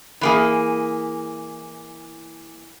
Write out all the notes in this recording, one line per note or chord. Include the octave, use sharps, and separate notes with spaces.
E3 A#3 G#4